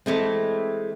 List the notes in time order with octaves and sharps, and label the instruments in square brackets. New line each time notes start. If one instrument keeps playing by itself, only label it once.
[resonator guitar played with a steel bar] E3 G#3 A3 C4